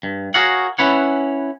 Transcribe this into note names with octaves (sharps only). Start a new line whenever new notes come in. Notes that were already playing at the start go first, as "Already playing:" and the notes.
G2
F#4 G#4 A#4 C#5 F5 F#5
C#4 E4 B4 C#5 F#5